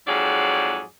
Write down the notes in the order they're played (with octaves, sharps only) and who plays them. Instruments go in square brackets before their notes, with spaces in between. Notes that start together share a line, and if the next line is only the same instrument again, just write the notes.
[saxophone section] F2 G#2 F#3 G#4 D5